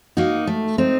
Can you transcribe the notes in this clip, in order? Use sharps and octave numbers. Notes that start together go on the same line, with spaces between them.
A#3 D#4 F#4
A3
C4 D#4